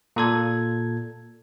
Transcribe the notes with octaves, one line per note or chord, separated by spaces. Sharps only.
A#2 A4 G#6